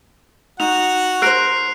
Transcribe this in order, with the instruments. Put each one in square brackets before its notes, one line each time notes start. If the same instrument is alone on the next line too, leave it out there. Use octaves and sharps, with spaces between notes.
[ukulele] D#4 [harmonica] F#4 F#5 [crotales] F7
[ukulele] A#4 C5 [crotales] F#6 C7 D7